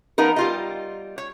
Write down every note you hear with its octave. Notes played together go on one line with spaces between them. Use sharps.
F3 B3 D#4 A#4
G3 F4 D#5
C#5